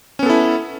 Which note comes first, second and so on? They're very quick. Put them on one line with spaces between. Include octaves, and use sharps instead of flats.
C#4 B3 A4 E4